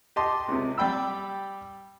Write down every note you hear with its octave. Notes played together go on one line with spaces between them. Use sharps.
G4 D#5 A5 C6 D6
C#2 C3
G3 D5 G5 B5 E6